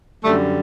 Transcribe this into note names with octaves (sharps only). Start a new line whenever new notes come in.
F#2 D3 G3 A3